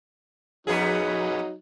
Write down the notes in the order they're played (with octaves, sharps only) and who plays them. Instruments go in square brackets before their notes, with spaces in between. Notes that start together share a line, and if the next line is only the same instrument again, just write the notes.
[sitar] F2 B3 G#4 [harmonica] F#3 D#4